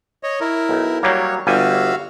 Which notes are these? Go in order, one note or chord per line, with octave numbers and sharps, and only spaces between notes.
C#5 D#5
E4 A#4
B1
F#3 G3 A#3 C#5
G1 G3 F#4 E5 F5 G#5